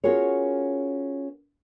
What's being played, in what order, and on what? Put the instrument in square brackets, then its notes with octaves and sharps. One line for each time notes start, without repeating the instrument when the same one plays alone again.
[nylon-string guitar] C#4 F4 F#4 G#4 A#4 C#5